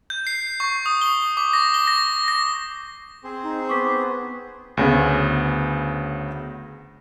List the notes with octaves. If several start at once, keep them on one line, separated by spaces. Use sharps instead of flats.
G6
C7
C#6
D#6
G7
D6
A#6
G7
A#6
A#6
C4 G#4 C5
D#4
B3 C#6 D6 B6
D2 C#3 B3